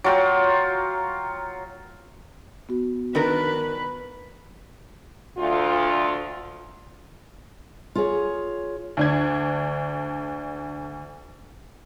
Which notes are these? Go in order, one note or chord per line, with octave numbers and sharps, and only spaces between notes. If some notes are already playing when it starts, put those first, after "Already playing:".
F#3 F4 G5
B3 F#4
D#3 D4 A#4 B4 B5
D2 F4
F4 G#4 C#5
D2 D4 G#6